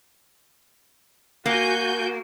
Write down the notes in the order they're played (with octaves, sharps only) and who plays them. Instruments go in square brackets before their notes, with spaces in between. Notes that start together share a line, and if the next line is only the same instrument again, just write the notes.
[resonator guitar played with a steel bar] A#3 [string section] F#4 G#5 G6